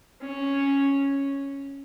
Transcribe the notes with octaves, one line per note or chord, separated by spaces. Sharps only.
C#4